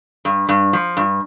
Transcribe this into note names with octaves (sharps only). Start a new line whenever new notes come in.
G2
G2
F3
G2